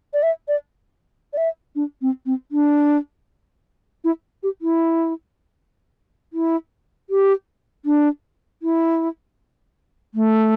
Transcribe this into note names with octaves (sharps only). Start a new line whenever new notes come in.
D5
E5
D5
D5
E5
D4
C4
C4
D4
E4
G4
E4
E4
G4
D4
E4
A3